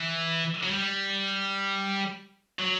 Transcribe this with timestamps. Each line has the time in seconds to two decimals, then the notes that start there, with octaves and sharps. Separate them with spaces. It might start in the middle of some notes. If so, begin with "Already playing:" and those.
Already playing: E3
0.63 F#3
0.71 G3
2.59 F#3